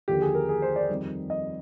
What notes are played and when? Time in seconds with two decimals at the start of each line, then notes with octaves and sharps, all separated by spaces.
0.08 D#2 D3 F3 G4
0.22 G#4
0.35 A#4
0.49 G#4
0.62 C5
0.76 D5
0.89 F2 D#3 G3
1.30 D#5